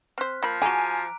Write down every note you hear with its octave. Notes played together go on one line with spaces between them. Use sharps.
C4 C5 F6 F#6 B6
F3 A#3 B5
F#4 G#4 G#5 A#5 D6 D7